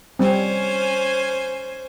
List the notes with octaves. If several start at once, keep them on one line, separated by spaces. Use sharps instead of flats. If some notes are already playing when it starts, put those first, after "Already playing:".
G3 C4 C#4 C5 G#5